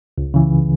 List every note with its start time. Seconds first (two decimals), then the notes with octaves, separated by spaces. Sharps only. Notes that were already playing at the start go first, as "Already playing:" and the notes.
0.18 C#2
0.34 C#3 E3